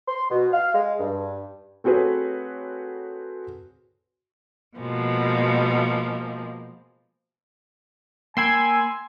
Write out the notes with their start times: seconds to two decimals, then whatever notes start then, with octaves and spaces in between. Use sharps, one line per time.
0.08 C6
0.30 B2
0.53 F5
0.75 G#3
1.00 G2
1.84 A3 C4 F#4 G#4 B4 C#5
4.78 B2 F3 G#3 A#3
8.37 A#3 G5 G#5 B5 C6 E6 G#6